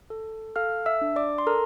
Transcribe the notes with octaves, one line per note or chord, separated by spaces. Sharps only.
A4
A4 F5 F6
E5 E6
D4
D5 D6
C6
A4 A#4 A#5